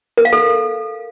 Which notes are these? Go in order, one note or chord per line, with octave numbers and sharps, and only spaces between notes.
A#4
F5
A4